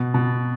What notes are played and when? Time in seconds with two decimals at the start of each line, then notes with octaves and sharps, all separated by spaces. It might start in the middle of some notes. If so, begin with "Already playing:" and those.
Already playing: B2
0.14 B2